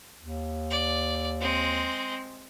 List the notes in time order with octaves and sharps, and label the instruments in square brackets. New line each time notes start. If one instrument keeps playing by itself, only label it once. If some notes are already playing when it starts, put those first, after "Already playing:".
[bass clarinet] D#2
[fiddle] D5
G#3 C4